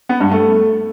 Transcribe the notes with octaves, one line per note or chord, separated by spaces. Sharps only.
B3
G2
A3